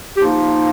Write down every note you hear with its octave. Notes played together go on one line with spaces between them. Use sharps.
F3 A#3 D#4 G4